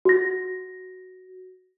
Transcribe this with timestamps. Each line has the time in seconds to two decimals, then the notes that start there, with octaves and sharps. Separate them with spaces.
0.05 F#4 A#6